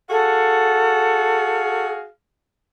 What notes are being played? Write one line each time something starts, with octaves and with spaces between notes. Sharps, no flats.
F#4 G#4 A4 F5